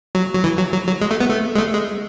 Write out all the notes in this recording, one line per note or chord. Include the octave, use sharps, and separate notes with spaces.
F#3
F#3
E3
F#3
F#3
F#3
G#3
A3
B3
A3
G#3
A3
G#3